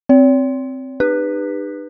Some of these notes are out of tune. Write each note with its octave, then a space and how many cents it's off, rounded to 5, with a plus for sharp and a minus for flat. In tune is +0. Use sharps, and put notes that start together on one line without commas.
C4 +0 C#5 +45
D#4 -40 G4 +35 B4 +0